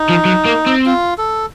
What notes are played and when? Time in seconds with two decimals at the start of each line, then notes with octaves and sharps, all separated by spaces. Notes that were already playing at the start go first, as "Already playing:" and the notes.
Already playing: D#4
0.09 F3
0.25 F#3
0.45 A#3
0.66 C4
0.86 F4
1.18 A4